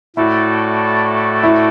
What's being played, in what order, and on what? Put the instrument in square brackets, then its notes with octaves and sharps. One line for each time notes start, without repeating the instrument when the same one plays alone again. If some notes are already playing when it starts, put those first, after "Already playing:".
[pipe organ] A2 A3 F#4 A4 D5 [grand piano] E4
[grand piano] E4